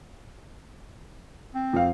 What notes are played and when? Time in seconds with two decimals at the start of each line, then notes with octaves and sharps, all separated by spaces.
1.55 C4
1.73 F2 F5